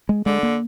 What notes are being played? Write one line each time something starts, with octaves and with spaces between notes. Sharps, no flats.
G#3
D3 G#3
A#3